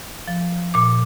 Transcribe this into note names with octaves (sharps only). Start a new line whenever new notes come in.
F3
A#2 D6